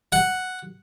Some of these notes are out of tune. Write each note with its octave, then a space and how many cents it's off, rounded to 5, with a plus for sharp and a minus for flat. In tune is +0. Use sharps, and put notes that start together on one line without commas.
F#5 +0